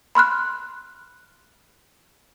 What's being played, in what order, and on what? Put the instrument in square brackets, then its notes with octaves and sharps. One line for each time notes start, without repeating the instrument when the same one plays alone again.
[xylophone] B5 C6 F6 F#6